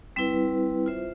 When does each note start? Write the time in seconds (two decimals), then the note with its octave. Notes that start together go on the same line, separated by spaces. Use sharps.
0.16 G3 C4 E4 B4
0.86 F4 C5 E5